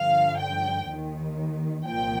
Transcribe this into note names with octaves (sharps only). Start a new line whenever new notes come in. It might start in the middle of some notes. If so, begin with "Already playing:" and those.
Already playing: G2 D3 F3 F5
G5
D#2 D#3
C2 A#2 F3 G5